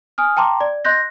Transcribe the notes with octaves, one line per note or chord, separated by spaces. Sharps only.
G#5 D#6 F6
G5 A5 A#5 C6 D6
D5
D#5 C6 F#6 G6 A#6